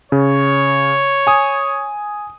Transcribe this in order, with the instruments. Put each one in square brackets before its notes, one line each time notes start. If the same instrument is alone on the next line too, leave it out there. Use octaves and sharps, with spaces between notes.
[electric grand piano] C#3 [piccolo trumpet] C#5
[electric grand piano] G#5 D#6